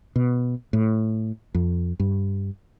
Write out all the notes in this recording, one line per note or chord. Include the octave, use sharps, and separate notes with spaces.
B2
A2
F2
G2